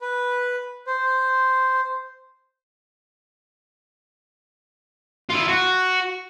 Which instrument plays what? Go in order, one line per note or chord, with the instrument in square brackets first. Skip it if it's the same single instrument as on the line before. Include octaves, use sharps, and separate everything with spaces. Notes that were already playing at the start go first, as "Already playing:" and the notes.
[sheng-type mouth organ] B4
C5
[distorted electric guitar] E4 F4
F#4